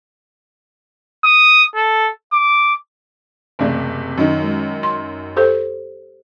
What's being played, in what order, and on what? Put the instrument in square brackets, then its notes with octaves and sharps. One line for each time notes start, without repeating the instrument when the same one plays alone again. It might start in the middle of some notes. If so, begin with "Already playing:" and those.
[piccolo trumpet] D#6
A4
D6
[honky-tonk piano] F#1 C3 [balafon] E3 A3 D5
[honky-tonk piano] F#2 D#3 [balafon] F#3
[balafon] G#3
C6
G4 A4 C5